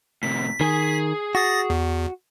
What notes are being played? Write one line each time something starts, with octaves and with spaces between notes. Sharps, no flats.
A2 C3 B6
D#3 G#4 G#5
F#4 D#6 A6 A#6
E2